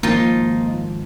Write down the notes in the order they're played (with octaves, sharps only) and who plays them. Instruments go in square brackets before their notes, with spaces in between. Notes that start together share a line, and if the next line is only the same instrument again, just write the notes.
[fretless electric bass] G#1 F3 [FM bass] A#3 [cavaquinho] D#4 F4